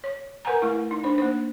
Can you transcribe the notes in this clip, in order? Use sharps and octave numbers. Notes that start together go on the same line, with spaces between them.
C#5
A#4 B4 F#5 G#5 A#5
A3 E4
D#4
D4 C5
A#3 C5